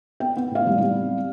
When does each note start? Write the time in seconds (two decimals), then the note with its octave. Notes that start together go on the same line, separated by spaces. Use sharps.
0.20 B3 G5
0.37 B3
0.51 A2 F5
0.67 G3
0.81 G3
0.96 C4